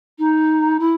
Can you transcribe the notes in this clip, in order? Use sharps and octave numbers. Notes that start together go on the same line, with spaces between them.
D#4
E4